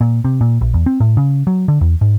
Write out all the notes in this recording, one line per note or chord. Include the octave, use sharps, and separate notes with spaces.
A#2
C3
A#2
A#1
E2
C4
A2
C#3
F#3
D3
E2
G#2